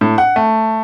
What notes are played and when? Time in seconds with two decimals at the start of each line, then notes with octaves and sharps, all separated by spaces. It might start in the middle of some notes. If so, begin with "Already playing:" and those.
0.01 A2
0.18 F#5
0.36 A3